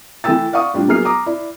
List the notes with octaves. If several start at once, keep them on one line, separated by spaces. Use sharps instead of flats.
E3 A3 E4 G5 E6 A6
D5 F5 F#5 C#6 D#6
A2 G3 D4 F4
F#3 A#3 B3 G#4 F6 C7
A#5 D6 D#6
E4 D5